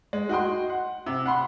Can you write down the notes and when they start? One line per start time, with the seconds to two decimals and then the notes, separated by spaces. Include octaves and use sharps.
0.13 G#3
0.29 F#4 D#5 G5 C6
0.70 F#5
1.06 C3
1.26 F#5 B5 C6